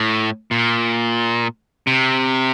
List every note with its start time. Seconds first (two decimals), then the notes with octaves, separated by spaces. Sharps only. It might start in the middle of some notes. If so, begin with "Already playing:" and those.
Already playing: A2
0.51 A#2
1.87 C3